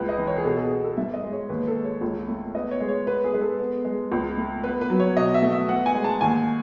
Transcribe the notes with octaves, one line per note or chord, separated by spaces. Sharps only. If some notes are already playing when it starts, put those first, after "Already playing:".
Already playing: C#2 B4
D#5
E3
C#5
G#4
B2 A4
G#4
B3 G#4
A4
G#2 E5
D#5
G#3
C#5
D#2 B4
A4
G#3
C#5
C#2
A3
B3 D#5
C#5
G#3
C#5
B3 B4
G#4
G#3 B4
A4
B3
G#3
C#2
A3
B3 B4
B4
F#3
C#5
B2 D#5
E5
A3
E5
B3 F#5
G#5
G#3
A5
D#2 G#5